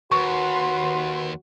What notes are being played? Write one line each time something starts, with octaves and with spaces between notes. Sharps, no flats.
D#2 F#4 B4 C6 C#6